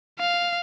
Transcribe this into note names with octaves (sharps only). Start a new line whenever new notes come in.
F5